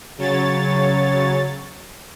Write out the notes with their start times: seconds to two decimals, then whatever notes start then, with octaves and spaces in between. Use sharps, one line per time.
0.18 C#3 F#3 C#5 A6